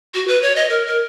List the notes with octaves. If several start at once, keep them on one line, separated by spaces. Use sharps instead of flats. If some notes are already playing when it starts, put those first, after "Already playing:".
F#4
B4
C#5
D#5
A#4
A#4